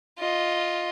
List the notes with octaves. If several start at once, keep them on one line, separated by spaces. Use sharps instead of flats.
F4 D#5